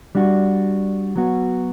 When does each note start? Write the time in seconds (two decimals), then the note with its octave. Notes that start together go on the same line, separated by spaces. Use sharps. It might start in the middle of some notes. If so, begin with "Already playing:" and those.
0.15 G3 D4 F#4
1.16 F#3 B3 F#4